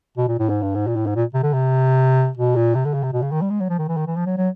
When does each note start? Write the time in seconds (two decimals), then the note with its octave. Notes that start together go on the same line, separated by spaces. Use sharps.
0.17 B2
0.28 A#2
0.39 A2
0.49 G#2
0.62 G2
0.75 G#2
0.87 A#2
0.96 A2
1.06 G#2
1.16 A#2
1.34 C3
1.43 D3
1.53 C3
2.37 B2
2.56 A#2
2.75 C3
2.85 D3
2.94 C#3
3.03 C3
3.13 B2
3.22 C#3
3.31 D#3
3.42 G3
3.50 G#3
3.60 F#3
3.69 F3
3.79 D#3
3.88 E3
3.97 D#3
4.07 E3
4.16 F3
4.26 F#3
4.38 F#3